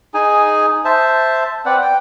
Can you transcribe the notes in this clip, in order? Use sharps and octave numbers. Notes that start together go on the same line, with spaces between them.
D#4 G#4 G#5
C5 E5 A5
C4 B4 D5 F#5
G5